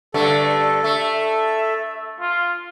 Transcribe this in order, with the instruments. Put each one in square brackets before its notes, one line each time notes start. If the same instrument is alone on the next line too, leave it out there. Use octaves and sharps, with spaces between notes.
[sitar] G2 D3 A3 [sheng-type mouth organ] A4
[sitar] A3 [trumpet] E5
[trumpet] F4